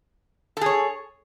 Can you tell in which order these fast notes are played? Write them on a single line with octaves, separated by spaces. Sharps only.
A4 G#4 C#5